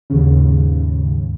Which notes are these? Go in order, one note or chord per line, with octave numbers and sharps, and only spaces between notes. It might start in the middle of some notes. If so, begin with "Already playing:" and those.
D#2 G#2 C#3